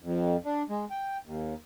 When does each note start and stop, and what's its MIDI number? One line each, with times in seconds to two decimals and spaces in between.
0.02 0.37 41
0.45 0.62 62
0.69 0.85 56
0.91 1.17 79
1.25 1.54 39